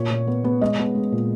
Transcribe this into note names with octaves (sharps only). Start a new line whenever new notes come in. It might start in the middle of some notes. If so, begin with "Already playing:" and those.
Already playing: A#2 C#5
A#2
B3
B3
G#3 D#5
B3
G#3
A#2